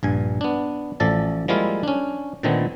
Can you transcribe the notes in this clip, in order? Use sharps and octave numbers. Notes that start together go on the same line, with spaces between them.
A#1 G2 G#5
B3 D4
A1 F3 A4 D5 A5
F3 G3 G#3 A#3 E4 F4
C#4 D4
A#2 D3 D#3 A3 B3 C4